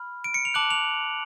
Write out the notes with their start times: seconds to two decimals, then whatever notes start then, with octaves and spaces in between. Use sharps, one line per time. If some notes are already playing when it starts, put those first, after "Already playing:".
Already playing: B5 F6
0.24 D7
0.34 C#7
0.45 F7
0.54 A5 D6 F#6 F#7
0.70 F7